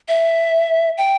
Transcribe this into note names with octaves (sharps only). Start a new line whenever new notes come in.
E5
G5